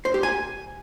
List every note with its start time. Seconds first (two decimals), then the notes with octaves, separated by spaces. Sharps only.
0.05 C5
0.14 G4
0.23 G#5